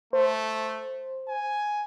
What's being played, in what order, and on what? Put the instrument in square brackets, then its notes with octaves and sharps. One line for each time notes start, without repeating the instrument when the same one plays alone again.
[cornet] A3 [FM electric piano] C5
[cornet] G#5